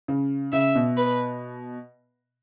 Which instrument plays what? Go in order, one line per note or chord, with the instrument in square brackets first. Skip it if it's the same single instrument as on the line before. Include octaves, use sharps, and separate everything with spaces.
[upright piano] C#3
[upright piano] C#3 [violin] E5
[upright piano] B2
[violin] B4